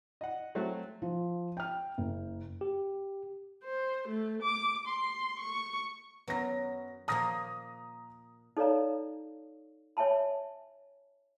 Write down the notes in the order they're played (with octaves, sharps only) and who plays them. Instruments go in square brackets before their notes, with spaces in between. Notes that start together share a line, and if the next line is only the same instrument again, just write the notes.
[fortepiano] D#5 F#5
F#3 A3 C4 F#4
[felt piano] F3
G5 F6
F#1
[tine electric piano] G4
[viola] C5
A3
D6
C6
C#6
[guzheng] F#2 F#3 [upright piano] B3 A#6
[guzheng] A#2 F3 A#3 [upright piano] A#5 D#6 A#6
[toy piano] D#4 A4 C#5 D5 F5 A#5
C#5 E5 G#5 A5 B5